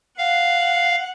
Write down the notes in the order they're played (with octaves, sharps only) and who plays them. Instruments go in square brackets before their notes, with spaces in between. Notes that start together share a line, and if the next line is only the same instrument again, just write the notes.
[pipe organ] F5 [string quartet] F#5